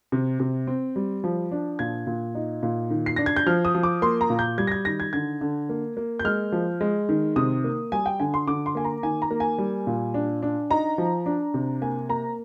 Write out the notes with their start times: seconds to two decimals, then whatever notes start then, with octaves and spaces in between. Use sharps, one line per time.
0.12 C3
0.40 C3
0.67 C4
0.96 G3
1.24 F3
1.52 D4
1.79 A#2 G#6
2.07 A#2
2.35 D#4
2.63 A#2
2.90 D#3
3.06 C7
3.16 D4 A#6
3.26 G#6
3.36 G6
3.46 F3 F6
3.65 D#6
3.75 F3
3.83 D6
4.02 A#3 C6
4.21 A#5
4.30 A#2
4.39 G6
4.58 G3 G#6
4.67 A#6
4.71 G#6
4.85 D#3 A#6
5.00 G#6
5.13 D3 G#6
5.41 D3
5.69 A#3
5.97 A#3
6.19 G6
6.24 G#3 F6
6.52 F3
6.81 G#3
7.09 D#3
7.36 C3 D#6
7.64 A#3
7.92 G3 G#5
8.06 G5
8.20 D3 G#5
8.34 C6
8.47 D3 D6
8.66 C6
8.75 A#3 G#5
8.85 A#5
9.03 D#3 G#5
9.22 A#5
9.31 A#3
9.40 G#5
9.58 G3
9.87 A#2
10.14 D4
10.42 D4
10.70 D#4 A#5
10.98 F3
11.26 D4
11.54 C3
11.82 A#3 G#5
12.09 A#3 A#5